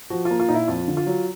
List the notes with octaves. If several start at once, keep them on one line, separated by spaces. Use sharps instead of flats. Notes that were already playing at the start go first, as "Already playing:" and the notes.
F3 F#4
F4
A#3
F4
A#2 D#4
E4
F2 F4
D3
F4
F#3